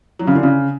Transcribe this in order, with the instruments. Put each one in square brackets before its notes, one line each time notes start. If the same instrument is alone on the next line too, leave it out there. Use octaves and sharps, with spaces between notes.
[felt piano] F#3
C#3
D3
C#3